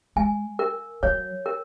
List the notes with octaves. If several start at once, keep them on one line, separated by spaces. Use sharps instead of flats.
G#3 G#5
A#4
F#3 C#5
A#4